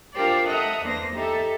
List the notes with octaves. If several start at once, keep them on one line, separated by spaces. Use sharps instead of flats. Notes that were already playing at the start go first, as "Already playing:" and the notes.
D4 F4 G4 A#4 C5 D5
A4 D#5 E5 F#5 A#5 D#6
E2 E3 A#3 D4 C5 A#6
D#4 G4 A4 E5